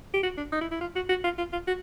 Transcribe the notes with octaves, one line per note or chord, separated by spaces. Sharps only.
G4
F#4
D4
D#4
E4
E4
F4
F#4
F#4
F4
F4
F4
F#4